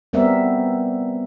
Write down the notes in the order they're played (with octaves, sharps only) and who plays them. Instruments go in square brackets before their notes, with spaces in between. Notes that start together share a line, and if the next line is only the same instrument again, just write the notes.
[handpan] G3 B3 C4 A#4 D5 E5